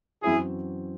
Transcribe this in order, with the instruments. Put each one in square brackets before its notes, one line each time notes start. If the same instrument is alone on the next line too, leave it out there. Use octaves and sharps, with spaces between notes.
[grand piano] F#2 E3 C4 F#4 [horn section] E4 G#4